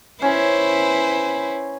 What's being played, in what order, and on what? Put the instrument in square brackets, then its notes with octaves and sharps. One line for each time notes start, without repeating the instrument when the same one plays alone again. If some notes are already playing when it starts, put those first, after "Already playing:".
[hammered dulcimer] C#4 [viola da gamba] E4 B4 C5